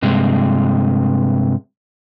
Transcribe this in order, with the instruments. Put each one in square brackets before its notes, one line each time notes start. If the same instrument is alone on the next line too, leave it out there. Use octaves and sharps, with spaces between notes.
[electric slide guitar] G2 C3 G#3